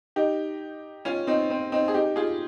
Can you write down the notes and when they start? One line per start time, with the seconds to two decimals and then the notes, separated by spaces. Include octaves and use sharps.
0.16 D#4 G4
1.05 C#4 F4
1.27 C4 D#4
1.50 C4
1.72 C4 D#4
1.88 G#4
1.94 D#4 G4
2.16 F4 G#4